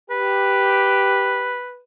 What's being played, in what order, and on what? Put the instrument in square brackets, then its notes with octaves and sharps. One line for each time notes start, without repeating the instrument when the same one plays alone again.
[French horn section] G4 [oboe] B4